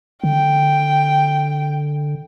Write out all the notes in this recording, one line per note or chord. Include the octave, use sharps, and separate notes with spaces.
D3 G5